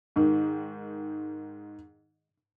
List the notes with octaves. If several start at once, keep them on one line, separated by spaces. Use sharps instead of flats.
G#2 D#3